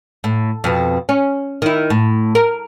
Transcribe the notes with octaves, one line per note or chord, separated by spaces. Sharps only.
A2
F2 B2
C#4
D#3 E4
A2
A#4